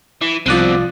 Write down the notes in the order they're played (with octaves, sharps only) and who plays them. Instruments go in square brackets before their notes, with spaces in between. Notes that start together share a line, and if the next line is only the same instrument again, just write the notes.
[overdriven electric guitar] E3
[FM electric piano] C2 D5 [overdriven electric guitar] B2 C4 [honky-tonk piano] F3 F#6 D#7